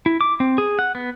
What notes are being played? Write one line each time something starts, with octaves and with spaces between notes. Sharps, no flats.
E4
D6
C4
G#4
F#5
B3